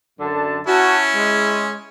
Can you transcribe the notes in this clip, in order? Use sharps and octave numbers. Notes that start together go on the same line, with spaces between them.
F#2 D3 A5
C#4 E4 F#4 A5
G#3